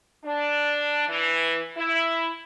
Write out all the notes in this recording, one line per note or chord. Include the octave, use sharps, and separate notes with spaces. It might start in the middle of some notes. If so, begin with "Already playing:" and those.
D4
E3
E4